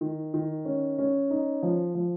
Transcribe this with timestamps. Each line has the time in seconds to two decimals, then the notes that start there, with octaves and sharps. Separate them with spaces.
0.01 D#3
0.34 D#3
0.65 C#4
0.99 C#4
1.30 D#4
1.63 F3
1.95 F3